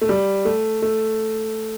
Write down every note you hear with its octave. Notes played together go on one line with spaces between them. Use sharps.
A3
G3
A3
A3